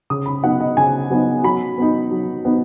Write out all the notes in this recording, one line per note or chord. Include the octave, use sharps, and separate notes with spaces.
C#3 D#6
B5
F#3 B3 D#4 F#5
D#5
C#3 G#5
F#3 B3 D#4
F#3 B5
B3 D#4
F#3
B3 D#4